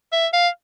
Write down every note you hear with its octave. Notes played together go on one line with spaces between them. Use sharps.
E5
F5